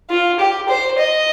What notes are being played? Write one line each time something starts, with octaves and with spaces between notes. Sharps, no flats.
F4
G4
C5
D#5